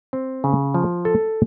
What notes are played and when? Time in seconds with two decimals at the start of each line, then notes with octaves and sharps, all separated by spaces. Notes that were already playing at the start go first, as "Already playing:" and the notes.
0.13 C4
0.44 C#3
0.74 F3
1.05 A4